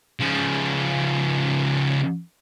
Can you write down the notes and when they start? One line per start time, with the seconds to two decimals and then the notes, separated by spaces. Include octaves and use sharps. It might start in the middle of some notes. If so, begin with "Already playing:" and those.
0.20 C#3 F3